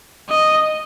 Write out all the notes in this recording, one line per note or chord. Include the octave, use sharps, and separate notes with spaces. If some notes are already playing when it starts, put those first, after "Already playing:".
D#5